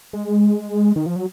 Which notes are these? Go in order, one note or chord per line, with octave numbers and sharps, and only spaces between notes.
G#3
D#3
F3
F#3